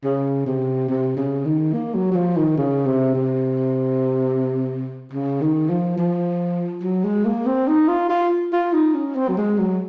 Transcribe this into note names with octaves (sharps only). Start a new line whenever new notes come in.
C#3
C3
C3
C#3
D#3
A#3
F#3
F#3
F3
D#3
C#3
C3
C3
C#3
D#3
F3
F3
F#3
G#3
A#3
C4
D#4
F4
F4
F4
D#4
C#4
C4
F#3
G#3
F#3